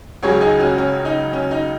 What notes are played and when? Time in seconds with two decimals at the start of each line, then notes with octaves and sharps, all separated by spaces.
0.23 C#2 C#3 F#3 G#4 C#5
0.41 D#4 G#4
0.60 C#4 F#4
0.78 C#4
1.05 D#4
1.33 C#4
1.51 D#4